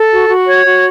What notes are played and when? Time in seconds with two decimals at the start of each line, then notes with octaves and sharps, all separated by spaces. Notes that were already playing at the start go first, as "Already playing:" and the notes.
Already playing: A4
0.12 F#4
0.29 F#4
0.46 C#5
0.65 F#4